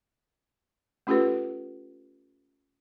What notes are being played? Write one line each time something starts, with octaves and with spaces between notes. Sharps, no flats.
A3 C#4 F4 G4 A4 B4